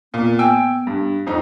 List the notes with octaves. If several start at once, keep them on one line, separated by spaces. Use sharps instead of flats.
A#2 B3
G5 G#5 E6
G2
F2 D#4